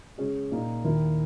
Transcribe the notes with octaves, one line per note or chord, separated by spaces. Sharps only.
C#3 G#3 C#4 G#4
A#2 A#3 D#4
D#2 D#3 A#3 E4 A#4